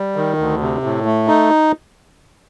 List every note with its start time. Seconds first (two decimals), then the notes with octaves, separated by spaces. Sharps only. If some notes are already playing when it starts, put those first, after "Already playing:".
Already playing: G3
0.16 D#3
0.38 D2
0.61 C3
0.83 A2
1.05 A3
1.27 D#4